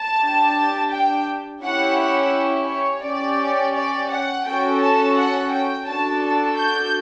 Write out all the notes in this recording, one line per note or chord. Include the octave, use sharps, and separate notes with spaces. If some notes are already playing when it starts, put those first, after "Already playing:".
Already playing: A5
D4 G4
G5
C#4 E4 G4 F#5
F#5
C#5
C#4 G4 D5
D5
F#5
C#4 F#4 A4 G5
A5
F#5
G5
D4 F#4 A4 A5
A5
G6